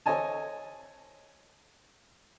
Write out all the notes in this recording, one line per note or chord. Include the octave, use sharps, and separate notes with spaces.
A4 C5 C#5 D#5 G#5 A5